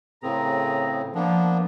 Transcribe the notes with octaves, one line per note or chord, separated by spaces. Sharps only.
A2 C#3 C4 G#4 A#4 A#5
F3 A#3 B3 D4